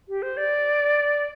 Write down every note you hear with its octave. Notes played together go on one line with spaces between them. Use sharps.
G4
C5
D5